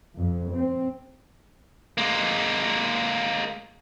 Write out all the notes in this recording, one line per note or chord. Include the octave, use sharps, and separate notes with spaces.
F2
C4
G#3 A#3